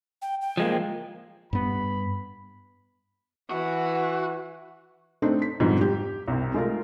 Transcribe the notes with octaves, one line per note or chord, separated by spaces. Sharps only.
G5
G5
F3 G#3 A#3
G2 B3 B5
E3 F#4
A3 C4 D4 D#4
B6
F2 G#2 B2 D3 F3 G3
G4
C2 C3
G#3 A3 F4 A#4